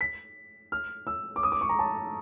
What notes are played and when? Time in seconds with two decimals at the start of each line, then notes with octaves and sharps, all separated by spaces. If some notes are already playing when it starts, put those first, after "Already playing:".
0.01 B6
0.72 F6
1.07 E6
1.36 D6
1.43 D#6
1.52 D6
1.61 C#6
1.69 A#5
1.79 A5